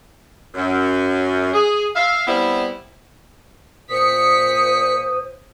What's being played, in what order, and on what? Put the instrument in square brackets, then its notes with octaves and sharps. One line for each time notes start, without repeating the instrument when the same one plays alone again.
[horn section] F#2
G#4
E5 F5
G3 B3 C4 E4
[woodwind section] A#2 D#6 [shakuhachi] C5 [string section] B6 C#7